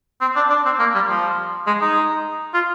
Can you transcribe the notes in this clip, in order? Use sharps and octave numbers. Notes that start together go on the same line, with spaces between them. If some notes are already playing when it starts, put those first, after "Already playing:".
C4
D4
D4
C4
A#3
G3
F3
G#3
D#4
F4